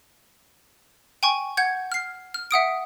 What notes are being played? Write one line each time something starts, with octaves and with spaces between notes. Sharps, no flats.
G5 G#5 C#6
F#5 G6 G#6
F6 C7
F6
E5 F#5 D#6 D7